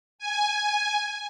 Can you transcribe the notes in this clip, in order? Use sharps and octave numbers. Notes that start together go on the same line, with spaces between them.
G#5